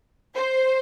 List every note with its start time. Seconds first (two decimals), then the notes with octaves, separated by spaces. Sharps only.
0.35 C5